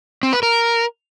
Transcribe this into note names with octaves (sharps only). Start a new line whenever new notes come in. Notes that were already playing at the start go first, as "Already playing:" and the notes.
C4
B4
A#4